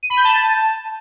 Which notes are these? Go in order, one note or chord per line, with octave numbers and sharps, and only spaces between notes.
D#7
B5
G6
A5